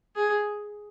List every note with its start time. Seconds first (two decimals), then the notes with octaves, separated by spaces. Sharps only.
0.16 G#4